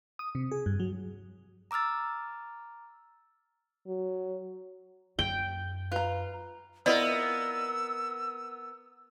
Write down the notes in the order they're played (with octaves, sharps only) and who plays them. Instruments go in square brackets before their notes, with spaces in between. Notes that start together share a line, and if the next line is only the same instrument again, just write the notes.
[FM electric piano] D#6
C3
G#4
G2
F#3
[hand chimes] A#5 D6 E6 F6 A6
[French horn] F#3
[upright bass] F#2 [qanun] G5
[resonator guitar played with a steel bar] F4 [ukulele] B4 A#5
[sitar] B3 A#4 [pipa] E4 F4 D#5 [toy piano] D5 [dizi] E6